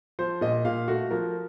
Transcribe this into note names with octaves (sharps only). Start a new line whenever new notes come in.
F3 C5
A#2 D#5
A#2 F5
A3 F#4
F3 A#4